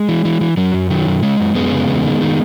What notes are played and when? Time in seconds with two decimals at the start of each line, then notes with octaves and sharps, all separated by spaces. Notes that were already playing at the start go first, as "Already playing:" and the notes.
Already playing: G#3
0.09 E3
0.25 E3
0.41 E3
0.57 F#2 F#3
0.74 F#2
0.90 D#3 F#3
1.07 F#2
1.23 C#3 G#3
1.39 F#2
1.55 F#2 G#3 B3
1.72 C#3
1.89 E2
2.04 D#3
2.21 D#3